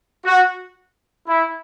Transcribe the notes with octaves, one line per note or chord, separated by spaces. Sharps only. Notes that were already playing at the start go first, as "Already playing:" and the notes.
F#4
E4